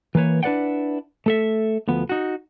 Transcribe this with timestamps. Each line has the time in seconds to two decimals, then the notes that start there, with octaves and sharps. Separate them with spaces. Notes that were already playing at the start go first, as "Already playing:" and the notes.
0.15 E3 A#3 B4 C#5
0.43 D4 E4 B4 D5 F#5 G5
1.26 A3 A4 E5
1.88 D2 F3 B3
2.09 D#4 F#4